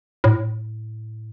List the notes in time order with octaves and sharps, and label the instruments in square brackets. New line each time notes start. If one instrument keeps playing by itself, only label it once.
[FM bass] A2